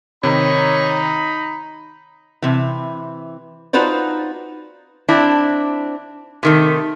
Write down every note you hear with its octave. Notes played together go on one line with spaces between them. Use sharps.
C3 D#3 D#4 C#5 A#5 B5
C3 E3
D#4 F4 F#4 B4 C5 D5
C4 D4 E4
C3 D#3 A3